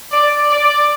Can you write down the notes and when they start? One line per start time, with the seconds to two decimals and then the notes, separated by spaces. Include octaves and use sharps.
0.11 D5
0.51 D5